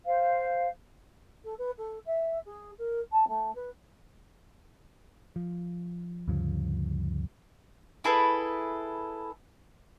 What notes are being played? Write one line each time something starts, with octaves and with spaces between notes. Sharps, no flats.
C5 F5
A4
B4
A4
E5
G#4
A#4
A5
A3
B4
F3
D2 G2 C#3 F3
E4 G#4 A4 B4